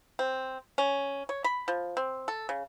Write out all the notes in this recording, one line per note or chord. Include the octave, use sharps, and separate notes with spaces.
C4
C#4
C#5
B5
F3
C4
A4
C#3